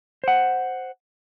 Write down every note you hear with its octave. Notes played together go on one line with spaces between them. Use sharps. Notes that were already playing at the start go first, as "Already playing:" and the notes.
C5 F#5